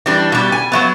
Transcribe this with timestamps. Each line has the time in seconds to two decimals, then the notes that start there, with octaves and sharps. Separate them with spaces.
0.06 E3 G3 D4
0.32 B2 G3
0.52 G#5
0.72 F#3 A3 B3